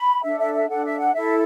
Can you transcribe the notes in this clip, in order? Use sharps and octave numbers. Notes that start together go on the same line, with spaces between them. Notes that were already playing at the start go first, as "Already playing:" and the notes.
Already playing: B5
D4 A4 E5
E5
E5
D4 A4 F#5
E5
F#5
E4 A4 E5